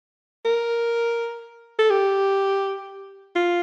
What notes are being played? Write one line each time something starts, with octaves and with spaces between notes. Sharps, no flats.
A#4
A4
G4
F4